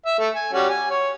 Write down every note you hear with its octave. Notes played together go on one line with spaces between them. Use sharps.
E5
A3
G#5
G3 C#4 F#4
G#5
C#5